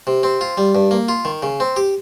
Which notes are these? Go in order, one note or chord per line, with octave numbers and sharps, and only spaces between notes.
C3
C4
F4
G3
G2
A#3
F4
D#3
C#3
C4
G4